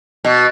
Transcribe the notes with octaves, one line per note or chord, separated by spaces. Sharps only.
B2